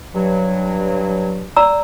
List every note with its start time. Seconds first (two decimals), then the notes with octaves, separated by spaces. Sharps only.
0.15 G2 F#3
1.56 D5 A#5 E6